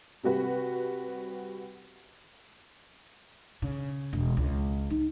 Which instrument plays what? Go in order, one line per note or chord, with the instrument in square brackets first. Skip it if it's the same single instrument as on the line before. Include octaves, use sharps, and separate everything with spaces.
[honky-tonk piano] C3 G3 F#4 B4
[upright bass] C#3
E1
C#2
D#4